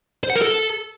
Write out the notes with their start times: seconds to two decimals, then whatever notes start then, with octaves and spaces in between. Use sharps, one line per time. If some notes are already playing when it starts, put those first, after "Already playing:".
0.24 C5
0.30 F#5
0.36 A#4
0.42 A4